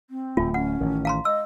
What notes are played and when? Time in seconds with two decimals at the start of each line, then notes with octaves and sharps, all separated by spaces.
0.10 C4
0.37 D1 A3 F4
0.54 C#4 F#5
0.80 A1 D#3
1.05 F5 A#5 C6
1.25 D#5 E6